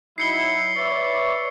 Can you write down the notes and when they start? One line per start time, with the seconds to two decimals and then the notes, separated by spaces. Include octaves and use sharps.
0.18 F#3 D#4 E4 C7 C#7 G7
0.76 B4 C#5 D5 E5